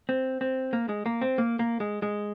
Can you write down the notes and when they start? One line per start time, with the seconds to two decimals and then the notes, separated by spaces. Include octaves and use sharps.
0.09 C4
0.41 C4
0.73 A#3
0.89 G#3
1.06 A#3
1.21 C4
1.38 A#3
1.59 A#3
1.80 G#3
2.02 G#3